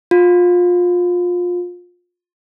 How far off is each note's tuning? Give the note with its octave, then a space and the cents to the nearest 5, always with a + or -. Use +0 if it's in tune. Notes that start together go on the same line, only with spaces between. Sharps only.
F4 +25